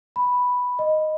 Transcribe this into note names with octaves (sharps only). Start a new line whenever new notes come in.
B5
D#5